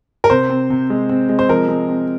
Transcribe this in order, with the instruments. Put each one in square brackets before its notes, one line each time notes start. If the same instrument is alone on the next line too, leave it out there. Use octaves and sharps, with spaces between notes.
[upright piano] A#4
[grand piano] C3 [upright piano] C5
[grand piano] C4
C3
G#3
C4
G#3
[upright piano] C5
[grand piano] F3 [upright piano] A#4
[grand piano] G#3
C4